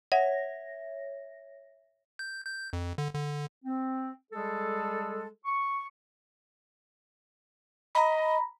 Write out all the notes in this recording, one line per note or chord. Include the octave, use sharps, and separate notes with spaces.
C#5 E5 F#5 A#6
G6
G6
F2
D3
D3
C4
G3 G#3 G#4 A4
C#6
D#5 A#5 B5